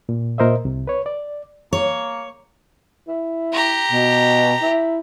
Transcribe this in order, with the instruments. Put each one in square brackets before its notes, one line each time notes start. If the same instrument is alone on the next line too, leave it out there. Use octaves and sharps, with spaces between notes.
[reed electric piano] A#2
A#2 A#4 C5 D#5 E5
C2 C3
B4 C#5
D5
[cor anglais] A#3 [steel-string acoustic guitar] C#5
[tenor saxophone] E4
[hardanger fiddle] G4 A#5
[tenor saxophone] B2
E4